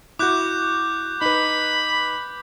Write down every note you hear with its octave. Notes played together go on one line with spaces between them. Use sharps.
E4 F#4 D6 F#6 G6
D#4 B4 B5